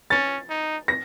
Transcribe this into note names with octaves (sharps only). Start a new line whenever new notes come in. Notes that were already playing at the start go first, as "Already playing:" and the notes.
C#4 A6
D#4
A#6